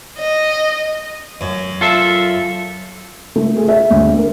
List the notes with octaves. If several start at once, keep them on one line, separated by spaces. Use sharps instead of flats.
D#5
F#2
F4 A4 E5
A3
G#4
E5
D2
A#4